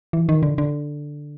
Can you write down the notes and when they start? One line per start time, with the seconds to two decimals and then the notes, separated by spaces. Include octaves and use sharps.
0.13 E3
0.29 D#3
0.43 D3
0.58 D3